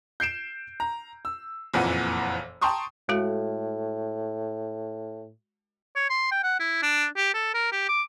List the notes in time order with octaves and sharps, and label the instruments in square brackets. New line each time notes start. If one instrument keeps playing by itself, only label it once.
[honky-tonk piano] G6 C7 D7 E7
A#5
E6
F#1 F2 A#2 E3 F#5 D#7
G5 A5 A#5 C6 C#6 D#6
[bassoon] A2 [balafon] G#3 F#4 A4
[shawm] C#5
C6
G5
F#5
E4
D4
G4
A4
A#4
G4
D6